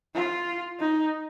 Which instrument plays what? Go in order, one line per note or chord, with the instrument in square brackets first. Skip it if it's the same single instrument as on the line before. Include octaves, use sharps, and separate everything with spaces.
[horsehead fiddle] F4
D#4